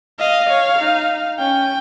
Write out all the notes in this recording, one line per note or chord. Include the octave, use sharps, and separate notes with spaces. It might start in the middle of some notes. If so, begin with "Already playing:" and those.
D#5 F5
C#5
D#4
C#4 G5